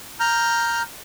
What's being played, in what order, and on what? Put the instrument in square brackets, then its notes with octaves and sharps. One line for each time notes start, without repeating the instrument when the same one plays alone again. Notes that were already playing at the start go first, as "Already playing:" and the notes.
[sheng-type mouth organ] A#5 F6 G6